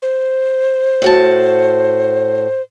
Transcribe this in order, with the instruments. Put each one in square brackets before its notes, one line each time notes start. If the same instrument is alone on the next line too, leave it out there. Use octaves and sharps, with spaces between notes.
[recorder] C5
[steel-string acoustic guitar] A2 F#4 A5